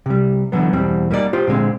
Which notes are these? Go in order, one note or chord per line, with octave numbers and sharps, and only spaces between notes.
C3 G3
D3 E3 F#3 B3
E2 B2 G3 C4
G3 A#3 D#4 F4 D5
F4 G4 C5
A#2 D3 G#3 C4